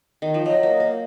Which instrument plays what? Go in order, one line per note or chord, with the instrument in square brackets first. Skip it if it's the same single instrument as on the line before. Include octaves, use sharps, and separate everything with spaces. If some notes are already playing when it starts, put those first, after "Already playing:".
[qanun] D#3
F3
[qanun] F#3 [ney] D#5
[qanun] A#3
A#3